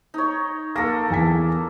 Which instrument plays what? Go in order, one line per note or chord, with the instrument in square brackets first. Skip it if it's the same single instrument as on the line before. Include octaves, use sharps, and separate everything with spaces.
[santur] D#4 C#5
[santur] A#3 A4 [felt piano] A#6
[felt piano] E2 G#5 B6